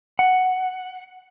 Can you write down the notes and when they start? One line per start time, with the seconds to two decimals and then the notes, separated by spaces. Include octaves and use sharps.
0.19 F#5